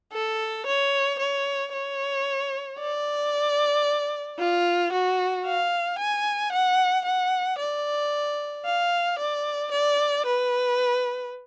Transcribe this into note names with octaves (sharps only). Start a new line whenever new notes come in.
A4
C#5
C#5
C#5
D5
F4
F#4
F5
G#5
F#5
F#5
D5
F5
D5
D5
B4